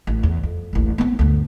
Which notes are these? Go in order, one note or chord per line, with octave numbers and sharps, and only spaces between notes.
A1
E2
F2
D#1 A1
B3 C4
D2 G2